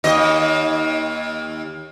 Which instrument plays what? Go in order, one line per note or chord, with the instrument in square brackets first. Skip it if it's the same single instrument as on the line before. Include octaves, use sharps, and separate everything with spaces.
[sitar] D#2 D#5